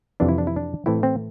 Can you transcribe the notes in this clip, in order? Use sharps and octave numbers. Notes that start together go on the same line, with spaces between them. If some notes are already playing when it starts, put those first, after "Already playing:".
F2 C3 E3 D4
E4
D4
E4
D4
A2 E3 A3 C4 E4
C4